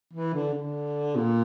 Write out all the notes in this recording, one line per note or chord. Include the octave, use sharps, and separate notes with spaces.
E3
D3
D3
A#2